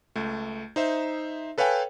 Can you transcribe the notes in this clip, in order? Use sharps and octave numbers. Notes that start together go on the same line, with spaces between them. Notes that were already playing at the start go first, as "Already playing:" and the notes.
C#2 A3
D#4 C5 E5
A4 B4 C#5 F5 G5 G#5